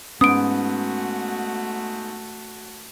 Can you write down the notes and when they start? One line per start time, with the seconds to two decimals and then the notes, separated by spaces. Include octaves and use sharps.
0.21 G#2 A3 B3 C#4 F#4 D#6 D7